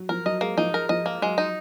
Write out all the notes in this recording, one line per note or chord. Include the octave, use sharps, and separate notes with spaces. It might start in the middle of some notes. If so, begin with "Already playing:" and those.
Already playing: F#3
F3 A#4
F#3 D#5
G#3 A#3
F3 D#4
A#4
F3 D#5
A#3
F#3 G#3
D#4